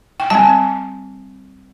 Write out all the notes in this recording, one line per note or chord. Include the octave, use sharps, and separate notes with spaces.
G5
G3 C4 A5